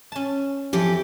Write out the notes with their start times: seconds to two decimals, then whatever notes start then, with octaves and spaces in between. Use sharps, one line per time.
0.12 C#4 A5
0.73 F2 E3 F3 G4